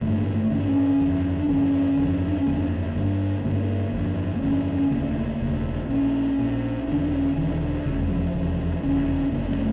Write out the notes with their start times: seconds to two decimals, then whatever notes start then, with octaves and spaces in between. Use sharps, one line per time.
0.01 A1 G2 D3 A3
0.18 A#3
0.34 A3
0.50 A1 G2 D3 C#4
0.59 D4
0.67 C#4
0.99 G1 F2 D3
1.40 D4
1.48 G1 F2 D3 C#4
1.97 G1 F2 D3
2.28 D4
2.37 C#4
2.46 G1 F2 D3 A#3
2.95 G1 G2 D3
3.44 G1 G2 D3 A#3
3.93 G1 F2 D3
4.36 A#3
4.42 G1 F2 D3 C#4
4.75 C#4
4.91 E1 D2 C#3 A#3
5.40 E1 D2 C#3
5.89 A#1 A#2 C#4
6.39 A#1 A#2
6.87 E1 E2 D3 D4
7.03 D4
7.12 C#4
7.36 E1 E2 D3 E3
7.51 E3
7.61 D3
7.86 F1 E2 C#3 E3
7.99 G3
8.10 F3
8.34 F1 E2 C#3
8.83 F1 E2 C#3 C#4
9.08 C#4
9.32 F1 E2 C#3 A#3
9.51 G3
9.56 A3